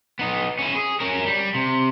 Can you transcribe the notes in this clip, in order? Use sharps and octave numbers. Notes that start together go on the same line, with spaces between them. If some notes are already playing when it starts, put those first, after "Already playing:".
B3 D#4
C#4 E4
G#4
C#4 A#4
G3
C3